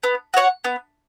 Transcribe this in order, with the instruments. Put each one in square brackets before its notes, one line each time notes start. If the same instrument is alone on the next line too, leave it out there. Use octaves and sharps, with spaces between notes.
[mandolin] B3
F#4 C#5 F#5
B3